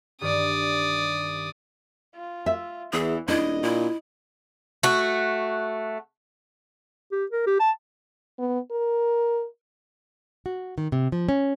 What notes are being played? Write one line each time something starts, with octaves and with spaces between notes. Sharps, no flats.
G2 D#3 D5 D#6
F4
E5
E2 E3 G#4
D#1 D4 E4 D#5
A#2 E4
A3 F#4
G4
A#4
G4
A5
B3
A#4
F#4
D#3
C3
F3
C#4